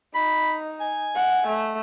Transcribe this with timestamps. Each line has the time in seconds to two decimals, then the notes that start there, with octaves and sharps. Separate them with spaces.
0.15 D#4 B5
0.80 G#5
1.15 F#5
1.47 A3